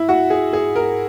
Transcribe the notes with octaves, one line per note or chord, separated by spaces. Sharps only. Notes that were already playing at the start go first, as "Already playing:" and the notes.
Already playing: E4
F#4
G#4
G#4
A#4